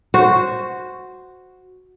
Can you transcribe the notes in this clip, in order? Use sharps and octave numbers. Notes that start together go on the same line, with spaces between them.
F#4 C5